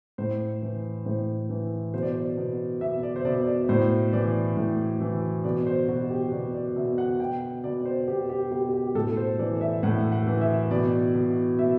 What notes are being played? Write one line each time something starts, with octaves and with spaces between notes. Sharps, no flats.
A2 C5
E3
A2 C5
E3
B2 C5
D5
C5
B2
B2 E5
D5
C5
B2 D5
D5
A2 C5
E3 D5
A2
E3
B2 D5
C5
B2 F#4
G4
B2 D5
D5
B2 E5
F#5
B2 G5
G5
B2 D5
C5
B2 G4
G4
B2 G4
G4
G4
A2 A4
C5
E3 D5
E5
A2 F#5
F#5
E3
E5
B2 D5
B2
B2 E5